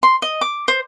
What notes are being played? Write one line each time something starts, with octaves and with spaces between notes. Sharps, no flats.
C6
D#5
D6
C5